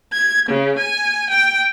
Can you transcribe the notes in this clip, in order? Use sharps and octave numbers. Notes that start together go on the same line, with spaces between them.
G#6
C#3
G#5
G5